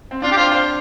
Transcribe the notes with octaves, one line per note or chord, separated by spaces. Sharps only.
C4
D4 F4
G4
F4 C5
C5